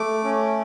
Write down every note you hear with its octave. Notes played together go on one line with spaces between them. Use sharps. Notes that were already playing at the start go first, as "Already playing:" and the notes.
Already playing: A3 D6
C#4